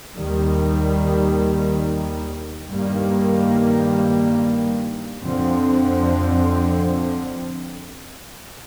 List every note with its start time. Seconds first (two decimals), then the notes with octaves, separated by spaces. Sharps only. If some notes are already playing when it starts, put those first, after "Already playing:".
0.15 D#2 D#3 G3
2.68 G2 D#3 G3 A#3
5.21 F2 D3 F3 C4